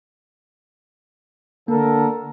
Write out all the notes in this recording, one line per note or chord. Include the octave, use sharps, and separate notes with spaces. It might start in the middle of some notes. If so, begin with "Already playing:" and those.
D3 A#3 A4 A#4